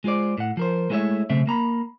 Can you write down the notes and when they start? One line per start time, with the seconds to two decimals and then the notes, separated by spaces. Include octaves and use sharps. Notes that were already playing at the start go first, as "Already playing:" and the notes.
0.04 G#3 F4 G#4 C5 D5
0.38 A2 F#5
0.57 F3 A#4 C5
0.90 G#3 A3 E4 B4 C#5 E5
1.30 B1 C#3 A3 C4 E5
1.47 A#3 A#5 B5